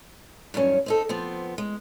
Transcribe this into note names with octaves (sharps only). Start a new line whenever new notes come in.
G2 D#3 F#3 C#4
C4 D#4 A4
F3 B3 C4
G#3